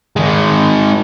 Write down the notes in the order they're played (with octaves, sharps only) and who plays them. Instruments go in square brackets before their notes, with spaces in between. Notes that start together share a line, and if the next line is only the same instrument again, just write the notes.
[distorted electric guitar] D#3 G#3